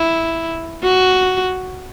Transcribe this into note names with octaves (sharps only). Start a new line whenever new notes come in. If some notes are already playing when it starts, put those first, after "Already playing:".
Already playing: E4
F#4